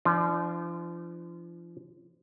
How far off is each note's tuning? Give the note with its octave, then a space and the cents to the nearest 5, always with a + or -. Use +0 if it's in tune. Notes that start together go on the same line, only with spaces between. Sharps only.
F3 -35 D4 +15